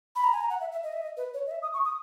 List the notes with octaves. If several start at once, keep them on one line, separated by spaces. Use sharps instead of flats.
B5
A#5
G#5
A#5
F#5
E5
E5
D#5
E5
D#5
B4
C#5
D#5
E5
D#6
C#6
D#6